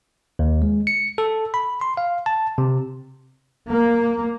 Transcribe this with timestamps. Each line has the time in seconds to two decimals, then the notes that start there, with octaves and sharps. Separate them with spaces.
0.39 D#2
0.62 G#3
0.87 C#7
1.18 A4
1.54 B5
1.81 C6
1.97 F5
2.26 A5
2.58 C3
3.70 A#3